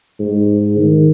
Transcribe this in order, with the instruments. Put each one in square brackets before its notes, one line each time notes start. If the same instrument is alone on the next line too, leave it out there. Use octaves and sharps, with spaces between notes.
[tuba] G#2
D#3